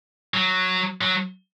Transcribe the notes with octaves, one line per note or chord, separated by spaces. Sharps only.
F#3
F#3